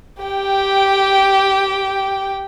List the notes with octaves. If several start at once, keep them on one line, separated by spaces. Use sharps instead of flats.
G4 G5